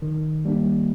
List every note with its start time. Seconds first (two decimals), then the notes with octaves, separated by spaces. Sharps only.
0.02 D#3
0.45 G3 A#3 D4